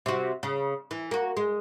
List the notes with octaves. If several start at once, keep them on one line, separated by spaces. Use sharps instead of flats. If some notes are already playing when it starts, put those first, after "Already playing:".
C3 F#4
C#3
E3
A#3 F#4
G#3